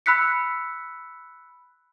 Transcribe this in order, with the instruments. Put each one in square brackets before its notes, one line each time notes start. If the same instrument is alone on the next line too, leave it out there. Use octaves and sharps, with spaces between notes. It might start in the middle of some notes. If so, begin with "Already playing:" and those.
[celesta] B5 E6 F#6 B6 C#7